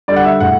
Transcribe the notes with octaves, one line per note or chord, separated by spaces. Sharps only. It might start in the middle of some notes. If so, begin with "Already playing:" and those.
D3 G3 D5
F#5
E5
A2 F#5